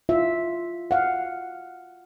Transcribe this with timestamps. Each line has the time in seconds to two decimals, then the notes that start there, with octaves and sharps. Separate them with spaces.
0.09 F4 E5
0.91 F5 F#5